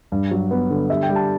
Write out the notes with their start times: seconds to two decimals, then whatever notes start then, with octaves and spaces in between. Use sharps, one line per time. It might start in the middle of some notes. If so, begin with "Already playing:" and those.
0.12 G2
0.31 F#3
0.51 B3
0.70 D3
0.90 G3 E5
1.03 G5
1.09 G3
1.16 A5